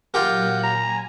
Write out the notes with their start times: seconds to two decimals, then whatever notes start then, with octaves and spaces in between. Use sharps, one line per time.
0.14 A#2 F#3 F4 G4 A#4 F#5
0.63 G#5 A#5